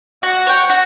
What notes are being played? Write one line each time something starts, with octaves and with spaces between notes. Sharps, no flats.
F#4 F#5
C#5 G5
F#4